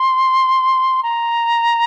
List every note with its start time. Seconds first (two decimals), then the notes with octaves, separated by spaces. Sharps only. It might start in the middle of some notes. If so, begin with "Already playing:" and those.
Already playing: C6
1.03 A#5